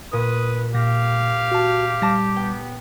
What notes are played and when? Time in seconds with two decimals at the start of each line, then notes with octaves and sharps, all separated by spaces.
0.13 A#2 B4 D#6
0.75 A#2 G4 F5 A#6
1.52 F#4 A5
2.02 G3 A5 D6 A#6
2.36 B3 G5